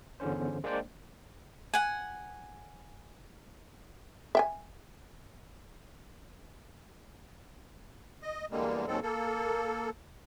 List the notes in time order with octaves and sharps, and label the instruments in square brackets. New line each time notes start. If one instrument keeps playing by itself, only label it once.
[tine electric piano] G1 E2 D3 C#4 C5
G#3 A#3 D4 C5 D5 G5
[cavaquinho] F#5 G#5
[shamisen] E5 G5 G#5
[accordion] D#5
E2 D3 G3 G#3 A#3
D#2 G#2 F#3 G#3 C4 A4
A#3 A4